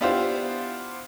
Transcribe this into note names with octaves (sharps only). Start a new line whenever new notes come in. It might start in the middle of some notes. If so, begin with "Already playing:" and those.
B3 D4 E4 F4 G4 C5